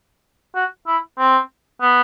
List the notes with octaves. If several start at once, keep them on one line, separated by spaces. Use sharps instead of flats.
F#4
E4
C4
B3